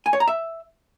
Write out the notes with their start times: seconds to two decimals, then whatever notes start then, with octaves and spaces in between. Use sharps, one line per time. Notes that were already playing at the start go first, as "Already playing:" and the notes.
0.06 G#5
0.13 C#5
0.20 A#5
0.28 E5